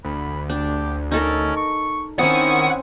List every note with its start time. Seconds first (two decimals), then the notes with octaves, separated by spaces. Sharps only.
0.05 D2 B5
0.49 D4 G4
1.11 C#4 D#4 A4 A#4
1.57 C#6
2.19 D#3 C4 C#4 E4 F#5 C#6 D#6